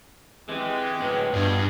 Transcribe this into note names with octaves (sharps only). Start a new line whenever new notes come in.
E3 G#3 C4 G4
A2 F#3 B4
G2 B2 F4 G#4